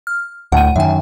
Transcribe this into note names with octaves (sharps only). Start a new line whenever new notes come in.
F6
D2 A2 F#5 D#7
F#2 D#3 E5 G#5